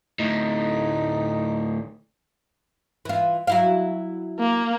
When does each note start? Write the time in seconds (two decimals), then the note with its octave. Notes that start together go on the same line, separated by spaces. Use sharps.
0.19 D2 A2 D#4
3.05 E3 F4
3.47 F#3 E4 F5
4.40 A#3